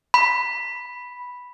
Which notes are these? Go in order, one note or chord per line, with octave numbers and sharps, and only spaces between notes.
B5